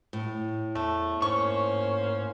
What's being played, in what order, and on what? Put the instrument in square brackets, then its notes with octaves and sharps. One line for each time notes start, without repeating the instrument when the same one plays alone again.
[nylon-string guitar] A2
[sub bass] E2 [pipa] A3
[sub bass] G#2 [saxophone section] A#3 C#4 C5 [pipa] C#6